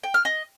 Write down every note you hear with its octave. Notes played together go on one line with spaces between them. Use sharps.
G5
F6
D#5